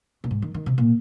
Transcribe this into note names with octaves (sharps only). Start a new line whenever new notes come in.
A#2
G#2
D#3
D#3
C3
A#2